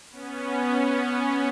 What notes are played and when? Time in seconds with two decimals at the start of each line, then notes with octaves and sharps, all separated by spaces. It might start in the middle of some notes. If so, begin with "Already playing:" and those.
0.11 B3 C#4